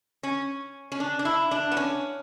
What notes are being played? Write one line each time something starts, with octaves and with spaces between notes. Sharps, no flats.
C#4
C#4
D4
D4
E4
D4
B3
C#4